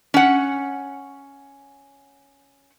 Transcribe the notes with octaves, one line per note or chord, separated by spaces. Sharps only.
C#4 F#5